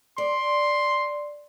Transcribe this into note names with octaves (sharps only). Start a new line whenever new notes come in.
D5 C6